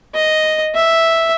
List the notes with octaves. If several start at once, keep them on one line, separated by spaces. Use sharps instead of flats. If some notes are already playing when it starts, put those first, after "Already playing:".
D#5
E5